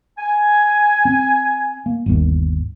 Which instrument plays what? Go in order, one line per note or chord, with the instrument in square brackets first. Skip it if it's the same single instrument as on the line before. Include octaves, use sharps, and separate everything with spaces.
[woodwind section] G#5
[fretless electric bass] C4
A#3
G1 D#2